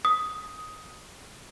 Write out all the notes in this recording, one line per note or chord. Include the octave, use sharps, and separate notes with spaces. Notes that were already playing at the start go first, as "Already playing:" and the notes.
D#6